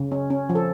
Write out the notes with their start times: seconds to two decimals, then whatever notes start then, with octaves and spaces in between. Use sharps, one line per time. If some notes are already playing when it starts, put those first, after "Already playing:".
Already playing: C#3
0.12 C#4
0.30 C#4
0.49 F3
0.55 A4